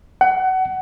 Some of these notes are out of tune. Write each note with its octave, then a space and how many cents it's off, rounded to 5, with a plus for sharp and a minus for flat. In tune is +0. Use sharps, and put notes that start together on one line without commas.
F#5 +25